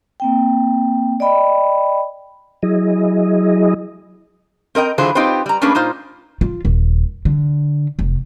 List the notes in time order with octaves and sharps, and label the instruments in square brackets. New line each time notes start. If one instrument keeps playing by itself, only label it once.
[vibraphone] A#3 C4 G5
D5 D#5 G5 B5
[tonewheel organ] F#3 E4 G#4 D#5
[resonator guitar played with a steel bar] C4 A#4 D#5 G5
D3 E3 F#3 F4 G#4 C5
C4 D#4 F4 G4 B4 C5
G3 A#5
A3 A#3 C#4 D4 G#4 B4
A#2 D#4 F4 C5
[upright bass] F4
D#1
D3
F1